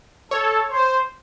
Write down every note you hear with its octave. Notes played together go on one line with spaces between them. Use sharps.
A4 C#5
C5